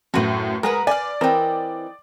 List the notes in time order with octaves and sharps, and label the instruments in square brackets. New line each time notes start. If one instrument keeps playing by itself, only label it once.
[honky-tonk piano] F#2 A2 [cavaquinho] F#4 B4
[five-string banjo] G#3 G#4 [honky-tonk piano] A#4 [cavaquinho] B4 F#5 A#5
[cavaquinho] B4 F5 [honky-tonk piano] D5 [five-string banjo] G#5
[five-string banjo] E3 C4 A#4 [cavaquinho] D#5 G5